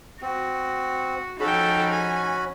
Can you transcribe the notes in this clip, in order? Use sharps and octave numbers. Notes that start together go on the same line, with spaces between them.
C4 F#4
F3 C#4 D#4 F#4 A4 G5 B5
G#5